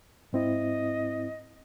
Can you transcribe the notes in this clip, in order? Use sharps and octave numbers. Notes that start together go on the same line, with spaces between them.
G#2 C4 E4 D#5